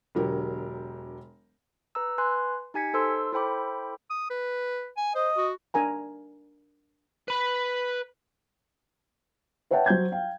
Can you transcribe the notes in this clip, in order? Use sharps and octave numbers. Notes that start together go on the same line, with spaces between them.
E1 D3 F#3 G4 A#4
B4 A#5 E6
B4 G#5 C6 F#6
D#4 G4 G#5 G#6 B6 C#7
D#4 A4 C5 C6 E6
E4 A4 C5 G5 B5 D6
D#6
B4
G#5
C5 D#5
F#4
D4 A#4 G#5 A#5
B4 B5
B4 C#5 E5 F#5 G5 A5
F#3 C5 G6 G#6
F5 G5